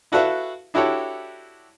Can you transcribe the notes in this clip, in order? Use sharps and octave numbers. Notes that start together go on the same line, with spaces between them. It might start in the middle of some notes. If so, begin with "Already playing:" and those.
E4 F#4 A4 B4 E5 F5
D4 E4 F#4 G4 A4 C#5